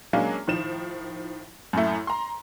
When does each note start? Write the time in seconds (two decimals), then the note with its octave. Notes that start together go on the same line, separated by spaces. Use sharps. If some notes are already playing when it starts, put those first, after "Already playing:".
0.13 F#3 G#3 A#3 C#4 D4
0.47 A2 D#3 F3 E7
1.73 F#2 A2 A3
2.07 A#5 C6